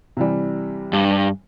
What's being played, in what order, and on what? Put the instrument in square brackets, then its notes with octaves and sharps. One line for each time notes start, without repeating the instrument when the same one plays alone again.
[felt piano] C3 E3 G3
[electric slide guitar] G2